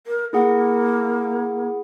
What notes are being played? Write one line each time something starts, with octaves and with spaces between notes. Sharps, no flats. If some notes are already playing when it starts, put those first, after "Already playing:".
A#4
A#3 E4 G#4 F#5